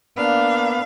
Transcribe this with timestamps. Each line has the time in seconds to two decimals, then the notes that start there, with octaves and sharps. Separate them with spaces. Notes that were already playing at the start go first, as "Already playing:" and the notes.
0.17 A#3 B3 D4 F5